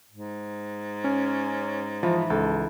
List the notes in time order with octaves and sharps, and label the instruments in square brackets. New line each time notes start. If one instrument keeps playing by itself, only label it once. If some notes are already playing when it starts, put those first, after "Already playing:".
[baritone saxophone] G#2
[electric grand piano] C#4
[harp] E3 D#4 [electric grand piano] F3
[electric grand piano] C#2 [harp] A4